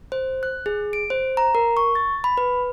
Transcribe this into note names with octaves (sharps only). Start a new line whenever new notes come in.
C5
F#6
G#4
D7
C5
A#5
A#4
C#6
A6
B5
B4